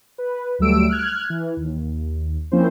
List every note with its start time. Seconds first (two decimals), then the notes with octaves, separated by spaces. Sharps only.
0.18 B4
0.59 D2 F#3 G3 A3 E6 D7
0.89 F6 F#6 G#6
1.30 E3
1.57 D#2
2.52 F3 A#3 C4 C#4 E4 C5